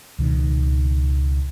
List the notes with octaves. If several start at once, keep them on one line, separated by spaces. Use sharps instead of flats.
C#2 B2 D#3